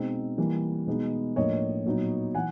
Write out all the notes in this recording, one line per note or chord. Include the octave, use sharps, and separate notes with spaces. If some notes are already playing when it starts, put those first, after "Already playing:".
Already playing: B2 G#3 C4 D#4
E3 G3 A#3
B2 G#3 B3 D#4
A2 F3 A#3 D4 C#5 D#5
A#2 F#3 B3 D#4
E3 F#5 G#5